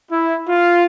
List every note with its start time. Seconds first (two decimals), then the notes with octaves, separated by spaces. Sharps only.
0.11 E4
0.48 F4